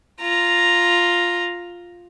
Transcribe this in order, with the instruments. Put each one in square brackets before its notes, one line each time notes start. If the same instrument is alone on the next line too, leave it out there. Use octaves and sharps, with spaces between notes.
[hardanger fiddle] F4 A#5